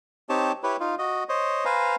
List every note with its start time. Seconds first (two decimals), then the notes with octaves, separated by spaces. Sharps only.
0.29 C4 D#4 G4 C#5 A5
0.63 E4 G4 B4 C#5
0.80 D#4 F4
0.99 F#4 D#5
1.29 C5 C#5 D#5
1.65 B4 C5 F5 G#5 A#5